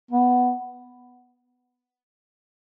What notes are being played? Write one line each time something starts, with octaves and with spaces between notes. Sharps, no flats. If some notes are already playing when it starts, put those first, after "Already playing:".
B3